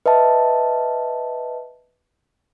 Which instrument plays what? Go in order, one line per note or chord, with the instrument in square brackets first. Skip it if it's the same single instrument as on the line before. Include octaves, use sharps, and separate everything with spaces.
[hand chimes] B4 D#5 E5 A5